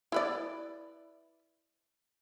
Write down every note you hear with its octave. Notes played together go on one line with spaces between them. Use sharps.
E4 B4 D5